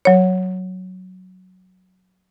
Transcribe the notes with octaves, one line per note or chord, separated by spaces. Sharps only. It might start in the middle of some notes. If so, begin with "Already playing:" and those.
F#3 C#5